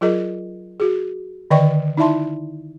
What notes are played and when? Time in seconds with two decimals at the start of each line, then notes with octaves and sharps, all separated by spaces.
0.01 F#3 F4 G#4 A#4 D#5
0.80 F#4 G#4
1.51 D3 D#3 D5 D#5 G5 C#6
1.97 D#4 E4 D5 E5 A5 C6